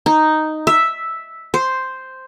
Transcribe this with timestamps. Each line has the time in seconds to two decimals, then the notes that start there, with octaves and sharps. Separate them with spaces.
0.06 D#4
0.67 E5
1.54 C5